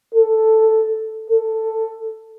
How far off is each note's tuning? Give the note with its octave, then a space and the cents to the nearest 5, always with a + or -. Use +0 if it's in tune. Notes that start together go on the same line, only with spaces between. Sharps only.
A4 +5
A4 +10